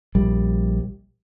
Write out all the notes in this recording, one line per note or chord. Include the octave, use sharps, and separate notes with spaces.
A#1 G3